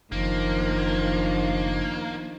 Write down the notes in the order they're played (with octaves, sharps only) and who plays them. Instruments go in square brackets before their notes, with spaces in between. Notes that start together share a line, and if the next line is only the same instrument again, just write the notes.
[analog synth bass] F#1 [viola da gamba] D#3 F3 D4 [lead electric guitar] A#3